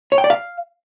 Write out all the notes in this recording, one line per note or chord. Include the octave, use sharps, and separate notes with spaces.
C#5
G5
D5
F5